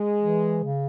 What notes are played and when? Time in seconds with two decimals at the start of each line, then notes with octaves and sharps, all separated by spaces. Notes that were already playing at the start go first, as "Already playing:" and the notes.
Already playing: G#3
0.21 E3
0.64 C#3